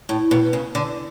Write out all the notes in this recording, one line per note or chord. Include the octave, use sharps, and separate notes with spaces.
A2
B2
C#3
D3